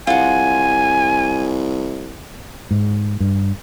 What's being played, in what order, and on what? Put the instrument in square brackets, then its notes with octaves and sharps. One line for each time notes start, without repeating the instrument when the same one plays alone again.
[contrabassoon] C2 [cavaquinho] F4 F#5 [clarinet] G#5
[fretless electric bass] G#2
G2